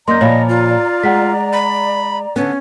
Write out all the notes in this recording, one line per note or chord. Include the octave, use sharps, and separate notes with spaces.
F#2 A#3 D5 D#5 A#5 C6 G6
A#2 F3 C#5 F5 B5
F4
G#3 G#4 F#5 B6
B5
D3 B3 C#4